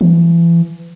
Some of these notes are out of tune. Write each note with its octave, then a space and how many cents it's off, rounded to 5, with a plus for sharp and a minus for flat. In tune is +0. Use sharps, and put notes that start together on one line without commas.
E3 +35